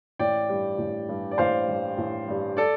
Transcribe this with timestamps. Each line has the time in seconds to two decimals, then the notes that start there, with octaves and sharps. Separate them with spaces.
0.19 A1 D5 G5
0.49 G2 G3
0.78 A1
1.09 G2 G3
1.31 D5
1.38 A1 C5 F5
1.68 G2 G3
1.98 A1
2.28 G2 G3
2.57 A4 D5